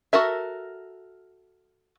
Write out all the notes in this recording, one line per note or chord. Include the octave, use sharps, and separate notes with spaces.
F#4 A4 A#4 E5